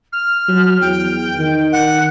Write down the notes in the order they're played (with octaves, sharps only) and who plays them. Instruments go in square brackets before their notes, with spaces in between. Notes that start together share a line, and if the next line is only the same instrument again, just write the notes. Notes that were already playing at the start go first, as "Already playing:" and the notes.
[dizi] F6
[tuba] F#3
[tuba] E2 [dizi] G5
[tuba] D#3
[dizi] F#5